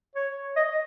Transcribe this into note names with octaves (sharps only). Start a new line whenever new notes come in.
C#5
D#5